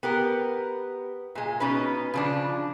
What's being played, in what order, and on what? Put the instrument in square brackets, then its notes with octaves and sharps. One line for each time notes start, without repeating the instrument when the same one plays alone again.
[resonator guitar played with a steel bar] B3 G4 A#4
A#2 G#3
B2 C#4 D#4 B4
C#3 F3 D4